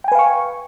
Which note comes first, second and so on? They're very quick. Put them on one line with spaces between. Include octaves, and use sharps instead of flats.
G5 G#5 B4 F5 C#6